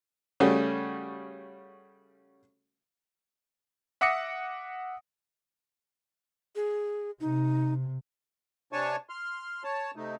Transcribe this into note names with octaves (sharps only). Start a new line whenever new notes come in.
C#3 G3 A3 C#4 F#4
E5 F#5 D6 D#6 A#6 C#7
G#4
C3 D#4
C3 D4 C#5 G#5 A5 C#6
C6 F6
C#5 A5
C3 A3 D#4